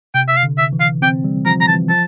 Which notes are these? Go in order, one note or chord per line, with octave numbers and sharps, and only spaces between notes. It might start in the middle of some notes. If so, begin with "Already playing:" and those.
C3 G5
E5
F5
D3
E5
E3
F5
C4 G5
G3
F3 A#5
A#5
E3 A5
F3 A5